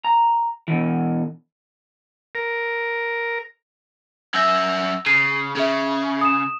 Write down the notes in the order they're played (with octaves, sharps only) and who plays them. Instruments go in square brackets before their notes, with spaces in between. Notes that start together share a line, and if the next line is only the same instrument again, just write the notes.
[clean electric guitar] A#5
B2 E3
[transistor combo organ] A#4
[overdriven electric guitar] F#2 E5 [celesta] E6 G6 A#6
[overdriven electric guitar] C#3 [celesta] C7 D#7
[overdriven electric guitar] C#3 [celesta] G#4 E5
[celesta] D#6 E7